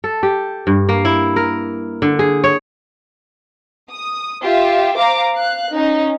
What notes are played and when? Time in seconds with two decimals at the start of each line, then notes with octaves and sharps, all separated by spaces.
0.04 A4
0.23 G4
0.67 G2
0.89 A#3
1.05 E4
1.36 A#4
2.02 D3
2.19 G#4
2.44 C#5
3.90 D#6
4.42 F4 G4 E5 F5
4.95 C5 F5 A#5 D6
5.34 F5 F#6
5.72 C#4 D#4